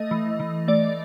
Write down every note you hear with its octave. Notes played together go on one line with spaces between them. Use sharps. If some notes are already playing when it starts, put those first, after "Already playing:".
Already playing: A3 D#5
E3
E3
A3 D5